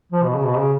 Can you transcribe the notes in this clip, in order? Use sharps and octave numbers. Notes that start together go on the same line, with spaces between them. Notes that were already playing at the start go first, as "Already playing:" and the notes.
F3
B2
C#3
B2
C#3